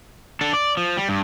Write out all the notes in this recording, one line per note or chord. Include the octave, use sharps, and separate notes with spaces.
D4 A4
D5
F3
G3
G2